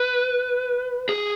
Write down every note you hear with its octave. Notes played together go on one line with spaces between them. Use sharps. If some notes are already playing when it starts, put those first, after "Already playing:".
Already playing: B4
G#4